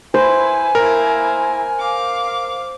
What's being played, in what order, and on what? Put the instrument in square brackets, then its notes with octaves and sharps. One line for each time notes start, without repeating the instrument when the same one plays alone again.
[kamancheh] E4 B4 [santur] C5 [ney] G#5
[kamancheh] A#3 E4 [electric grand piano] A#4
[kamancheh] F5 D6